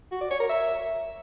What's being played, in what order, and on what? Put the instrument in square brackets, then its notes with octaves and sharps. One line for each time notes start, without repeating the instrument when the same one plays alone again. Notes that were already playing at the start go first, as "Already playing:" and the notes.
[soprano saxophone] F#4
D5
C#5
A#4
E5